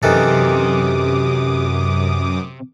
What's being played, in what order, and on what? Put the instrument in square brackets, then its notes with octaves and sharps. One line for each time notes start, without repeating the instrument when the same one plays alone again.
[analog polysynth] F#2 D6 D#6 [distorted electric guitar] C3 [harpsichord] D#3 E3 A4 [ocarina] G4